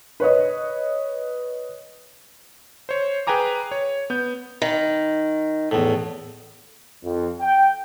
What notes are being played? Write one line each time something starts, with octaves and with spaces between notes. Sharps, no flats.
B4 C#5 D#5
C5 C#5
G#4 B4 G5 G#5 A#5 D6
C#5
B3 G6
D#3
E2 A2
F2
G5